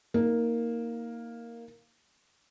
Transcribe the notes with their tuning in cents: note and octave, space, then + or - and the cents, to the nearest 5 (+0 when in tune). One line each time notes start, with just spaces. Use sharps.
A#3 +0 D#4 +25